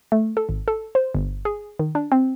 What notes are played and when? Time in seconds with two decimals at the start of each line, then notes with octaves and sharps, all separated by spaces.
0.12 A3
0.37 A4
0.49 G#1
0.68 A4
0.95 C5
1.15 G1
1.45 G#4
1.79 D#3
1.95 D4
2.12 C4